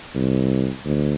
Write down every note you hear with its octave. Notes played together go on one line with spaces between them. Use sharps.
C2
D2